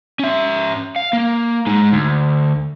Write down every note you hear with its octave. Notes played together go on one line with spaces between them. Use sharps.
C#4 E5
F5
A#3
G#3 D#4
D2